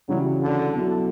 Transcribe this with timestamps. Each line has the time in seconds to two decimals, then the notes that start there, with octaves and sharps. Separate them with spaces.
0.09 C#3 E3 F#3 G3 C#4 F#4
0.42 D3
0.75 B2 F#3 B3 E4 A4